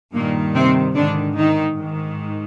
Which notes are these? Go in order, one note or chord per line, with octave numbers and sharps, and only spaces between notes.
G2 A#2 D#3 A#3
C3 C4
G#2 D3 D#3 D4
D#3 D#4
G#2 D#3